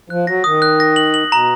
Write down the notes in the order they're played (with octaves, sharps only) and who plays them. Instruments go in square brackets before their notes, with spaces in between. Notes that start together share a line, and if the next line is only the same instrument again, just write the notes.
[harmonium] F3 [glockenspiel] F#6
[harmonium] F#3 [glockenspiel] A#6
[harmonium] D#3 [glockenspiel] D#6
[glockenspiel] F#6
A#6
F#7
F#7
[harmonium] B2 [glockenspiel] A#5